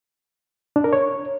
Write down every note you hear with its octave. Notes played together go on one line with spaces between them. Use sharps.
D4
A#4
C#5